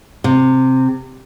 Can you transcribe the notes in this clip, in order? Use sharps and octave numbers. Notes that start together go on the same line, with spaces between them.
C3